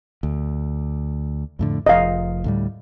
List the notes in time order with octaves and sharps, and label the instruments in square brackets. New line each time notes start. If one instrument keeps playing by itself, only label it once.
[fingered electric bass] D2
F2 A2 D3
[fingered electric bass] F1 F3 [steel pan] D#5 F5
[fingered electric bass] D2 A2 G3